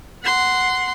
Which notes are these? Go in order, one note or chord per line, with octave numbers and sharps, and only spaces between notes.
F#5 C6